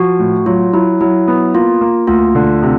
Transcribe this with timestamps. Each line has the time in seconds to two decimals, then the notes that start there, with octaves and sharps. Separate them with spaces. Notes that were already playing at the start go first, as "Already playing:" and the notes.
Already playing: F3 F#4
0.19 A2
0.46 F#3 F4
0.73 F#3 E4
1.01 F#3 E4
1.27 B3
1.55 A#3 F4
1.81 A#3
2.07 D2 F4
2.35 D3
2.62 C3